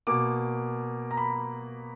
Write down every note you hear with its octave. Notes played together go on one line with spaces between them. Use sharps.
B2 A#3 D6
A#5
B5